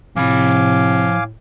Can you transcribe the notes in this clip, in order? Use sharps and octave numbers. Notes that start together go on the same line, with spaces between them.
A2 C3 F3 F5 G#5 B5 D6